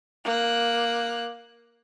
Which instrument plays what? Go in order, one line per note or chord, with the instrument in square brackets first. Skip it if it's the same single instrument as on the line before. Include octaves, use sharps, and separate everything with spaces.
[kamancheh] A#3 F#6